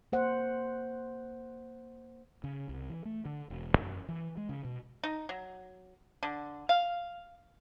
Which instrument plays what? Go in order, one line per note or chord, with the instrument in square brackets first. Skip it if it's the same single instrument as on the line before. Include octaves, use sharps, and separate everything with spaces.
[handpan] A#3 C5 F#5
[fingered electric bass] C#3
C2
E3
A3
D3
E1
F#2
E3
G#3
C#3
B2
[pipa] D#4
F#3
D3
F5